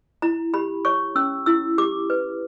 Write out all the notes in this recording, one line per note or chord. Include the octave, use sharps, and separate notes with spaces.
E4 A#5
G4 B5
C#5 C#6
C#4 E6
E4 E6
G4 D6
B4